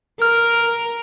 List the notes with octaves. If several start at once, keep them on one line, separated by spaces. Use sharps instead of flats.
A#4 F6